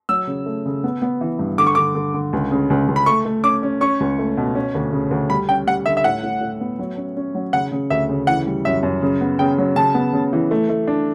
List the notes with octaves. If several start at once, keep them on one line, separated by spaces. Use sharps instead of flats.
F#3 E6
C#3
A3
C#3
B3
B3
E3
G2
D3 D6
C#6
D3 D6
D3
D3
C#2
C#3
C#2
C#2
B5
A3 C#6
A3
C#4 D6
C#4
C#4 C#6
C#2
A3
B2
C#4
D2
C#3
D2
G3 B5
C#4 G5
G3 F#5
D3 E5
E5
A2 F#5
A2
A2
B3
F#3
C#4
C#4
F#3
C#3 F#5
C#3
D2 E5
C#3
E3 F#5
G3
F#2 E5
F#2
C#3
B3
C#3 G5
F#3
C#3 A5
B3
C#3
E3
A3
A3
D4